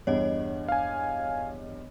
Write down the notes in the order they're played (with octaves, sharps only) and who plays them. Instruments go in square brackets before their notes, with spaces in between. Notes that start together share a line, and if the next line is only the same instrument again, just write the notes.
[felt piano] E2 G2 [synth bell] C#5 D#5
[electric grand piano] F5 G#5